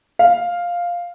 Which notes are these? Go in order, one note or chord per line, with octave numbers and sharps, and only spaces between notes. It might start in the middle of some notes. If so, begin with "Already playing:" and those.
F5